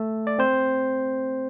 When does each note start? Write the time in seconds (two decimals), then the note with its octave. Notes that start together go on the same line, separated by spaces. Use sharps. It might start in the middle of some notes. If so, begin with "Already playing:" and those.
Already playing: A3 A4
0.27 D5
0.39 C4 C5